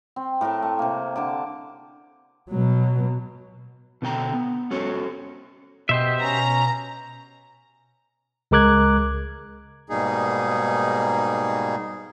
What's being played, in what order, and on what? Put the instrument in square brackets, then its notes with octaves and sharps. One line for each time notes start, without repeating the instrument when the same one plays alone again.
[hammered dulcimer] C4
A2 A#4 G5 A5
A3
C3 A#3
D3 A5 D6
[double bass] B2 F#3
[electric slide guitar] B2 D3 G5 A#5
B3
C#4 F#4 A4 C#5
[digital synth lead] B2 [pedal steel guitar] G4 C5 E5 [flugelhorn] D#5
[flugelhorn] C#4 [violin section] A#5
[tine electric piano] C#2 G#3 A#4 D6 F#6 G#6
[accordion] G#2 B2 G3 A#3 D#4 G#4